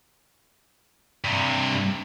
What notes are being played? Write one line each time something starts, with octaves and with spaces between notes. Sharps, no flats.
G2 C3